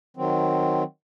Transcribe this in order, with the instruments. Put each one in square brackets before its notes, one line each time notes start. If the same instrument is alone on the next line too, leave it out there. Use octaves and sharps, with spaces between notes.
[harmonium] D#3 F#3 C4